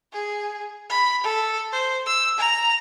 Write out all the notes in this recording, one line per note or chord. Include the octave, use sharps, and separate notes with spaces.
G#4
B5
A4
C5
E6
A#5